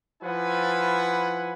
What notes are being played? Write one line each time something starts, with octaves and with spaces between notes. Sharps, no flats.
F3 E4 B4 F#5 G#5